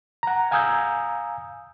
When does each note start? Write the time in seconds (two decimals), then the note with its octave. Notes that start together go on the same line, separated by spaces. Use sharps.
0.23 F#5 A#5
0.51 F5 G#5 A#5 D#6 E6 G6